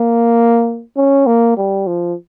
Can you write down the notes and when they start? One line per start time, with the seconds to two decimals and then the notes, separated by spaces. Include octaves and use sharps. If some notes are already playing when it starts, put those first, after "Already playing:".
Already playing: A#3
0.96 C#4
1.26 A#3
1.57 G3
1.87 F3